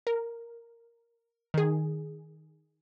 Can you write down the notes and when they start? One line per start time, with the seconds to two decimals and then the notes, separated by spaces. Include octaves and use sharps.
0.07 A#4
1.54 D#3 G#4